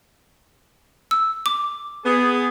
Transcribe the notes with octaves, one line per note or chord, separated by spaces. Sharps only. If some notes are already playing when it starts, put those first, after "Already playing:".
E6
D6
B3 G#4